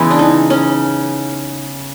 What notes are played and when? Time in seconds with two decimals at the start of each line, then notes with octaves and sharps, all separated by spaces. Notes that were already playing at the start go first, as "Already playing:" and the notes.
Already playing: C#3 E3 G#3 B3 E4
0.10 D4
0.19 D#4
0.50 C#4